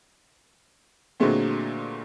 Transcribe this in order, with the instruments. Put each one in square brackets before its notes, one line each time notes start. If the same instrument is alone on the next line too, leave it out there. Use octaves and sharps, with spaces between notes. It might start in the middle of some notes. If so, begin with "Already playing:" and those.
[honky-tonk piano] A#2 D3 F#3 G#3 A3 C4